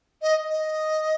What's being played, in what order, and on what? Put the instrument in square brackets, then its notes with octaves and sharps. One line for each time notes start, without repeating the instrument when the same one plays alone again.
[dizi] D#5
D#5